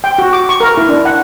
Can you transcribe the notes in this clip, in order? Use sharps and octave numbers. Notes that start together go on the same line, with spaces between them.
G5
F#4
D6
C#6
A#4
E4
D4
F#5